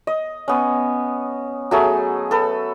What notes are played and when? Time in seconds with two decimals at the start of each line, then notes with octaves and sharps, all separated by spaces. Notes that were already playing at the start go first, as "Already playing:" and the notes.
0.07 D#5
0.48 B3 C#4
1.71 F#3 A3 G#4
2.31 A4 B4